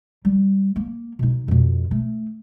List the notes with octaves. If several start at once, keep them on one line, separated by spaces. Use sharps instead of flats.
G3
A#3
B2 D#4
F2 B2
A3